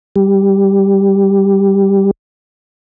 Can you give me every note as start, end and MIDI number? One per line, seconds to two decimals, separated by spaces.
0.16 2.11 55
0.16 2.11 67